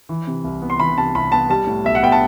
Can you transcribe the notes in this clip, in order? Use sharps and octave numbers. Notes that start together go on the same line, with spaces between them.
E3
C3
C2
B3
C6
E3 B5
C3 A5
C2 B5
B3 A5
G3 A5
A2
B1 E5
F#5
B3 G5
A5